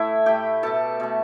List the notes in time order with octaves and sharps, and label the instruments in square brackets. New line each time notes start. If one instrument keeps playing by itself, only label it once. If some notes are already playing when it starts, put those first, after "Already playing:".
Already playing: [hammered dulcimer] A2 A3 E4 E5
A2 A3 G4 G5
B2 A3 A4 A5
B2 A3